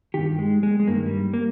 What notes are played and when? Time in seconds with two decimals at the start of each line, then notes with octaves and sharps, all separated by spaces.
0.14 G2 D#3 G4
0.39 G#3
0.63 G#3
0.80 G#3
0.87 G2 D#3 A#3
1.06 G3
1.34 A#3